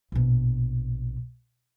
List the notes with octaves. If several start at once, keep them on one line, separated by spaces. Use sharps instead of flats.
A#1 B2